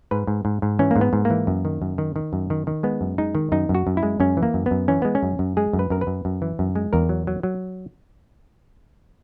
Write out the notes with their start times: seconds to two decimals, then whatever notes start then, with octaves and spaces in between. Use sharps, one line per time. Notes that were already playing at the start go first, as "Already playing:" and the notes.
0.11 G#2 B4
0.27 G#2
0.45 G#2
0.62 G#2
0.79 E3 C#4
0.91 G#2 A#3
1.01 B3
1.13 G#2
1.25 A#3
1.30 E3
1.47 F#2
1.65 D#3
1.82 F#2
1.98 D#3
2.16 D#3
2.33 F#2
2.50 D#3
2.67 D#3
2.83 G#3 B3
3.01 F#2
3.18 G#3 D#4
3.35 D#3
3.52 F#2 D#4
3.69 F#2
3.75 F#4
3.87 F#2
3.97 E4
4.03 G#3
4.20 F#2 C#4
4.37 E3
4.43 A#3
4.54 F#2
4.66 B3
4.71 F#2
4.88 E3 C#4
5.02 G#3 B3
5.15 C#4
5.23 F#2
5.39 F#2
5.57 G#3 G#4
5.73 F#2
5.79 B4
5.90 F#2 A#4
6.01 B4
6.07 F#2
6.25 F#2
6.42 E3
6.59 F#2
6.76 G#3
6.93 E2 A#4
7.09 F#3
7.27 F#3
7.43 F#3